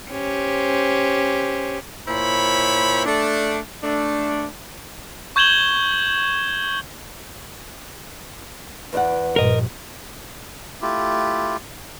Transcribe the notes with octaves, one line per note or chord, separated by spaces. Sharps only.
C#4 G4 C5
A#2 E4 C5 C#5 B5
A3 D4
A3 D4
C#6 G6 G#6 E7 F#7 G7
E2 B4 D5 F#5
A#1 G2 A#4 D#5
A3 E4 F4 G4